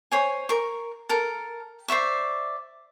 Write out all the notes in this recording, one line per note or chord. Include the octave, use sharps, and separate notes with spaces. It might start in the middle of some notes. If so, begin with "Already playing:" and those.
C5 C#5 G#5
A#4 C#6
A4 A#4
C5 D5 E5 C#6